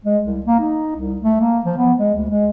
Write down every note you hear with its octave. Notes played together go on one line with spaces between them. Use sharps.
G#3
C2
A#3
D#4
C2
A3
A#3
F3
B3
G#3
D2
G#3